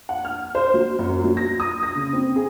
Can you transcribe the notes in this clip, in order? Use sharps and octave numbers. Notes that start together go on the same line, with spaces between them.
F#5
F6
C5
F#3
F#2
F#3
A#6
D#6
A#6
C#3
C4
G#4